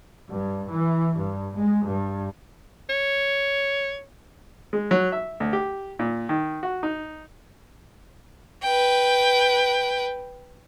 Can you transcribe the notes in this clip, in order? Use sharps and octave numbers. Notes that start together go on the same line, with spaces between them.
G2
E3
G2
G#3
G2
C#5
G#3
F#3
E5
D2
G4
A#2
D#3
F#4
D#4
B4 G5